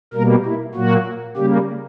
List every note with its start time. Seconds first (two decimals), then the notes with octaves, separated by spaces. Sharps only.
0.13 B2 G3 A#3 A#4
0.45 E4
0.75 A#2 F#3 A#3 F#4
1.37 C#3 G3 A#3 G4